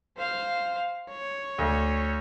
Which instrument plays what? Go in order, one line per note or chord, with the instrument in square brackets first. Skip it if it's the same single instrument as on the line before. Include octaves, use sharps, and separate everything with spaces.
[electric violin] C5 F5
C#5
[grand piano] D2